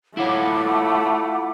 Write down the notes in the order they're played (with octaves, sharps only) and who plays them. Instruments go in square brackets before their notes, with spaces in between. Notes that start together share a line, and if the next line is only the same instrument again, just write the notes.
[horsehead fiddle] A3 [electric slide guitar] E4 F4 C#5 [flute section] F#5 B5 D6